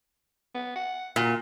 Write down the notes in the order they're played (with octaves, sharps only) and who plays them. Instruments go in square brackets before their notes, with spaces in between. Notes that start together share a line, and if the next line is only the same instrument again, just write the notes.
[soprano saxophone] B3
F#5
[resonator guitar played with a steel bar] A#2 [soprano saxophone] F#4